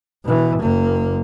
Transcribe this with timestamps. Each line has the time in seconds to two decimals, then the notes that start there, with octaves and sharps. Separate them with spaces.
0.25 B2 E3
0.59 F#1 A#3